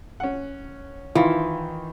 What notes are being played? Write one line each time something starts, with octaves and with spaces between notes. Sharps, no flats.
C#4 F#5
D#3 E3 F4